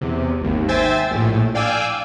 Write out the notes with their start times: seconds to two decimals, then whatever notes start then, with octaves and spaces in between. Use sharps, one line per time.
0.01 E2 C3
0.41 G#1 D#2
0.68 C5 E5 G5 G#5 E6 A6
1.11 A#1 A2
1.55 D5 F5 G5 G#5 D6 E6